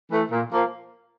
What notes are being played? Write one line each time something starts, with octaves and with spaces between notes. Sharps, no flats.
E3 A3
A#2
F3 A#3